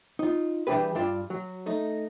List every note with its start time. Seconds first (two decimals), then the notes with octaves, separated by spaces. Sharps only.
0.19 D#4 F4
0.67 E3 G3 D4 G4 G#4 B4
0.95 G2 G3 D4 F4 D5 A5
1.30 F#3
1.66 A3 D#4